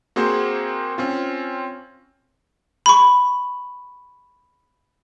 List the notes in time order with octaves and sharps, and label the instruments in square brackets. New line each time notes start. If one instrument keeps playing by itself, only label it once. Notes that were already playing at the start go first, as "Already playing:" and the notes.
[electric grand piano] A#3 C4 F#4 G#4 C5
C4 C#4 F4
[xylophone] B5 C#6